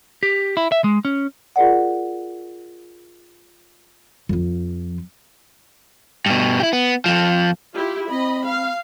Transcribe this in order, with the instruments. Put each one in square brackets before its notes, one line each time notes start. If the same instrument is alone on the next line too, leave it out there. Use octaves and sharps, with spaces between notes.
[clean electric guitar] G4
E4
E5
G#3
C#4
[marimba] F4 G#4 A#4 D5 F#5
[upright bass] F2 F3
[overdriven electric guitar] G2 B2
E4 G4
B3
F2 F3
[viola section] E4 F4 G4
[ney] C4 [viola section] D#5 B5
[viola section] F5